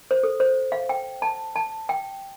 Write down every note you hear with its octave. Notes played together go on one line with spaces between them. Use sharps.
C5
A4
C5
F5
G5
A5
A5
G5